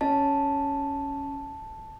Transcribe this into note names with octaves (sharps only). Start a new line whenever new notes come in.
C#4 A5